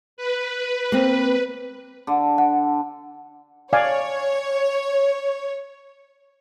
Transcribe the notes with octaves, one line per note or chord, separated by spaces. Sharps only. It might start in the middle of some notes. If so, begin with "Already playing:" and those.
B4
A#3 C4
D3
F#5
C#5 D5 F5 G#5